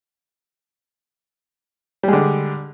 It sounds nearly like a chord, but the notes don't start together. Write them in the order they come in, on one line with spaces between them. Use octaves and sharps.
G3 G#3 D3